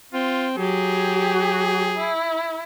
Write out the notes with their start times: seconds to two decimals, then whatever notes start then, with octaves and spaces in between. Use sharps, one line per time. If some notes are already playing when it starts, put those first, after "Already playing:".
0.13 C4 F4
0.57 F#3 G4 G#4
1.97 E4